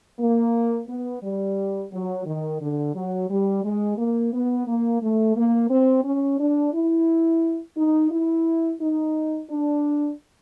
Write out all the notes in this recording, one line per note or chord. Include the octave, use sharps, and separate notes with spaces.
A#3
B3
G3
F#3
D#3
D3
F#3
G3
G#3
A#3
B3
A#3
A3
A#3
C4
C#4
D4
E4
D#4
E4
D#4
D4